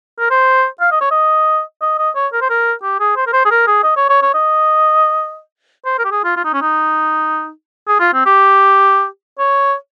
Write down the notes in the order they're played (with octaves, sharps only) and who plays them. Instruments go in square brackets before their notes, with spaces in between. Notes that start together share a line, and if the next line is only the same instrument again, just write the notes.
[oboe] A#4
C5
F5
D#5
C#5
D#5
D#5
D#5
C#5
A#4
C5
A#4
G4
G#4
C5
A#4
C5
G#4
A#4
G#4
D#5
C#5
C#5
C#5
D#5
C5
A#4
G4
G#4
F4
F4
D#4
C#4
D#4
G#4
F4
C4
G4
C#5